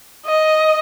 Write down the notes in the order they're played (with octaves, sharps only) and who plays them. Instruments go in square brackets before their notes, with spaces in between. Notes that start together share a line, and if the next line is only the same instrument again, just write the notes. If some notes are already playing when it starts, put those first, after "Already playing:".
[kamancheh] D#5